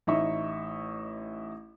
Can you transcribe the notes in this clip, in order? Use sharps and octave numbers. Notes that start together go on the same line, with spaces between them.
A1 D#4 E4 E5 C#6